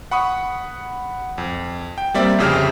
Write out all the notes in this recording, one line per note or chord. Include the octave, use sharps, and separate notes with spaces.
F#5 B5 C#6 D#6
F2
G5
G3 A#3 C4 D5 E5
G1 F2 C#3 G4 E5 F6